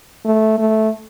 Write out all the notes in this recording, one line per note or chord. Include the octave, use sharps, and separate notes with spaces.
A3
A3